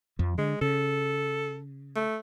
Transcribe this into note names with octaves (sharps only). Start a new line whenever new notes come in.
F2 F3
D3 G#3
C#3 A4
A3